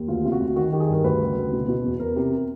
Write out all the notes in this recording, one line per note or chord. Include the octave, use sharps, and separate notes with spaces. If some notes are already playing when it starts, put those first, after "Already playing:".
Already playing: D#2
D2 F4
C3 F4
F#4
D2
D#3 F#4
D#3 G4
G#4
G2 A#4
D2 B4
C#3
D2
B2
B2
E2
E2 A#4
C3